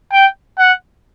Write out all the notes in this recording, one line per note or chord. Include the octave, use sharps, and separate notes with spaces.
G5
F#5